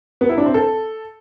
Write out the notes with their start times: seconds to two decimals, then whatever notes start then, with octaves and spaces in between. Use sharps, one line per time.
0.21 B3
0.29 E4
0.38 D4
0.46 C4
0.54 A4